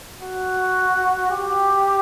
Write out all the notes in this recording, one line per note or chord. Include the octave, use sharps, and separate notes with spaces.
F#4
G4